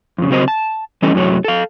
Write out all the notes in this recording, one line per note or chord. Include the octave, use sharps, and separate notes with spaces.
F2 C#3
C#3 F#3 C4 A#4 C5 D#5
A5
E3 G3 A3 C#4 A4 D#5
F#2 A2 C3 F#3 A3 C#5
A4 F5